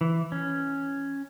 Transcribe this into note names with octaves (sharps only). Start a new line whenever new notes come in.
E3
C#4